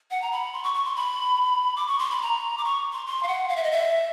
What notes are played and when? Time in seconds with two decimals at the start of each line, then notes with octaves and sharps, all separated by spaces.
0.11 F#5
0.22 A#5
0.32 B5
0.53 C6
0.63 C#6
0.74 C#6
0.85 C6
0.96 B5
1.76 D6
1.87 C#6
1.99 C6
2.10 B5
2.22 A#5
2.58 D6
2.65 C#6
2.92 C6
3.06 C6
3.23 F5
3.28 F#5
3.49 F5
3.56 E5
3.64 D#5
3.71 E5